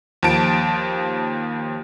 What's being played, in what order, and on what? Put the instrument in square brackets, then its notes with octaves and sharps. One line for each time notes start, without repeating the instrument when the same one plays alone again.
[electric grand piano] D#2 F3 A5 D7